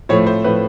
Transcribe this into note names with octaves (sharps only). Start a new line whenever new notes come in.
A2 F3 A3 C#5
C5
A2 F3 A3 B4